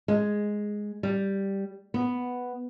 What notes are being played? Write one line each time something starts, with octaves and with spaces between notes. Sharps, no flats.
G#3
G3
B3